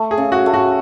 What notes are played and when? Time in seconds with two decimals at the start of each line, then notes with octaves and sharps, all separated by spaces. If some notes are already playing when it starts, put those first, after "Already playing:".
Already playing: A3
0.11 G#4
0.18 C#3
0.32 F#4
0.46 A3
0.54 F#4